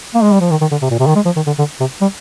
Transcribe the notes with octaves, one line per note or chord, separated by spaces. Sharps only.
A#3
G#3
G3
F3
D#3
D#3
D3
C3
A#2
C3
D#3
G#3
F3
D#3
D3
D3
C3
G3